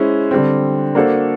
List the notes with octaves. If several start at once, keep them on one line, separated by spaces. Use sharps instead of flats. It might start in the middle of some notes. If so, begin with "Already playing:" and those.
Already playing: G#3 C#4 E4 C5
D3 G3 C4
A#3 D4 F#4 A4 C5